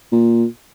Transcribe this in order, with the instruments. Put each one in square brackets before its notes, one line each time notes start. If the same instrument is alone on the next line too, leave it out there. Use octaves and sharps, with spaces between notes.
[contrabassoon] A#2